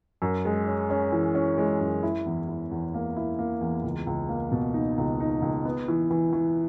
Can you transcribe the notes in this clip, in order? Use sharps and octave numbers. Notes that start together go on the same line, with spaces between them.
F#2
G#3
C#4
C#4
E3
C#4
G#3
F#2
E4
E2
E4
E2
A#3
E4
A#3
E2
C#2
C#2
A#3
B2
D#4
C#2
D#4
C#2
B3
E3
E3
E3